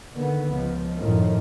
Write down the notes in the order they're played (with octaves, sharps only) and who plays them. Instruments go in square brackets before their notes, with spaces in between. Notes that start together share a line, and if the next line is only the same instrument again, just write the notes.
[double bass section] D3 D#3 B3
C#2 F3
F#2 A2 D#3 F3